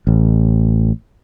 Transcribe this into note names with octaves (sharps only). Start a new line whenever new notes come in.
A1